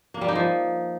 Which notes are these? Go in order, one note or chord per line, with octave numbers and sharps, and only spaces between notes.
A#3
G3
D#4
F3